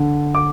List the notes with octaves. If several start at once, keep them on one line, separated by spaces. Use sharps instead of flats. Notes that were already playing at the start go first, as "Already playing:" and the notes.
Already playing: D3
D6